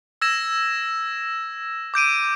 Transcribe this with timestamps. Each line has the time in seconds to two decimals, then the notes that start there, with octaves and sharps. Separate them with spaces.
0.22 E6 G#6 A#6 E7
1.94 D6 G6 D7 D#7